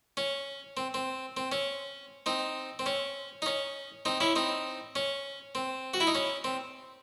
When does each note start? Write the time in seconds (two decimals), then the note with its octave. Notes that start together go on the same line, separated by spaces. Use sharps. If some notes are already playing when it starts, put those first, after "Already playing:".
0.17 C#4
0.77 C4
0.94 C4
1.37 C4
1.52 C#4
2.26 C4 D#4
2.79 C4
2.86 C#4
3.42 D#4
3.46 C#4
4.05 C4 D#4
4.20 C#4 E4
4.35 C4 D#4
4.96 C#4
5.55 C4
5.94 F#4
6.00 E4
6.07 D#4
6.15 C#4
6.44 C4